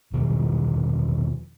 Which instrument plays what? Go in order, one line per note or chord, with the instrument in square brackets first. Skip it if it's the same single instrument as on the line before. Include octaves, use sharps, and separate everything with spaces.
[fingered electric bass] E2 B2 D#3 F3